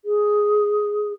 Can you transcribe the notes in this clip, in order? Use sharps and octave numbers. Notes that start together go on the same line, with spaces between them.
G#4